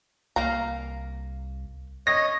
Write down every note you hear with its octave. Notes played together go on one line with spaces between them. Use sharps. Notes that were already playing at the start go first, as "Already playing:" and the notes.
C2 A#3 F5 A#5
C#5 D#5 A#6